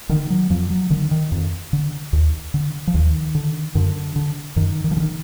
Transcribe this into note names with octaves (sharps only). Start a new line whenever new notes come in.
D3 D#3
F#3
F2 F3
F#3
D3 D#3
D#3
F2
D3
D#2
D3
F3
D#2 D#3
D3
F#2 D3
D3
F#2 D#3
D#3
F3
D3
D#3